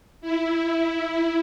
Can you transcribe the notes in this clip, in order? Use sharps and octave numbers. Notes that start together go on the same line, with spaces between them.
E4